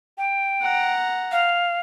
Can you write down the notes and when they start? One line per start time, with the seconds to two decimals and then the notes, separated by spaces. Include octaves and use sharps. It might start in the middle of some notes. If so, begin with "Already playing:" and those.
0.18 G5
0.62 F#5 A#5
1.32 F5